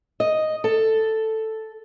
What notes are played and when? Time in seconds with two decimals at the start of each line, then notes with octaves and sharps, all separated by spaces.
0.20 D#5
0.64 A4